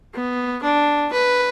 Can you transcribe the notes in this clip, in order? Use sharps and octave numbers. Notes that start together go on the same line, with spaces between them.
B3
D4
B4